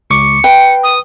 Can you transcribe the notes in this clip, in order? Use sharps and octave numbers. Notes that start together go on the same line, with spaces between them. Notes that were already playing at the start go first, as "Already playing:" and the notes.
C#2 C#6 D6 C#7
B4 G5
D#6